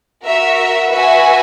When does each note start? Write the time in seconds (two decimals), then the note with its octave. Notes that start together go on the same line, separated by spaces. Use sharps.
0.25 F#4 A#4 E5
0.91 F#4 B4 E5 G#5